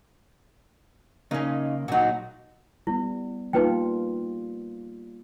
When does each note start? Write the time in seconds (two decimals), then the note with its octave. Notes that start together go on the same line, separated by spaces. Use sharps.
1.31 C#3 A#3 C#4 D#4
1.88 A#2 F#3 D#4 F#4
2.87 G3 B3 E4
3.53 G3 A#3 D#4 F4 B4 G5